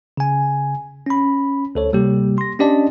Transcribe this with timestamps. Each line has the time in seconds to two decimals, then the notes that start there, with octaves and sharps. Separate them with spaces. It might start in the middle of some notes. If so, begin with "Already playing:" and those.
0.17 C#3 G#5
1.06 C#4 B5
1.75 D2 A4 C#5
1.93 C3 G3 A#3 G4
2.38 C6 A#6
2.59 C#4 D4 G4 D5 D#5 A5